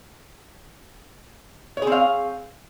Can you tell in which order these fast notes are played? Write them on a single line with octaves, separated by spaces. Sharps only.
C#5 G#4 C4 F5